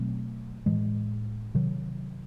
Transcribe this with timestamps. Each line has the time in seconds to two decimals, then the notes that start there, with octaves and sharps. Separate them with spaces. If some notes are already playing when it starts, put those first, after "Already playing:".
Already playing: B2 F#3 A3 C4
0.66 A2 E3 G#3
1.55 C3 D#3 F#3